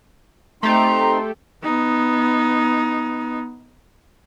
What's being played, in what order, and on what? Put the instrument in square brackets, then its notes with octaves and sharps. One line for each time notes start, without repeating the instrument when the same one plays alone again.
[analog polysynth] A3 G4 [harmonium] C4 D#4 [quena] A#5 [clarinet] C6
[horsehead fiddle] B3 D#4